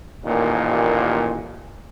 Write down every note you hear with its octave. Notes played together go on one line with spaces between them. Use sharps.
A1 D#2 A#2